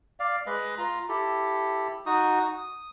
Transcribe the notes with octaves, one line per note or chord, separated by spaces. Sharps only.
D5 F5
G#3 B4 D#5
F4 A#5
E4 G4 A4
D#4 F#4 D#6
D#6